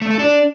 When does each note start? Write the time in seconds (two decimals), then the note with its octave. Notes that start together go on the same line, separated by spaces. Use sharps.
0.02 A3
0.10 A4
0.19 D4